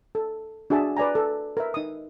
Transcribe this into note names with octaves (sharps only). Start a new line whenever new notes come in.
A4
D4 F#4 G#4 E5 A5
B4 D5 G#5 A#5
A4
A#4 B4 E5
D#4 D#6